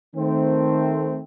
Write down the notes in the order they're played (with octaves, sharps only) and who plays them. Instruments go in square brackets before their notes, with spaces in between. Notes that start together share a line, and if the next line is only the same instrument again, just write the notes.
[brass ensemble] D#3 A3 C4